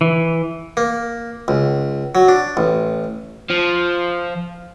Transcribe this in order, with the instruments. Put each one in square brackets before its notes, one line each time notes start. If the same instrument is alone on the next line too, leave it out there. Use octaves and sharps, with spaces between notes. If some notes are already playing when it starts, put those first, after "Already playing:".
[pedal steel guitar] E3
[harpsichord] A#3
C#2
F#3
D4
A1
[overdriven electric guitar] F3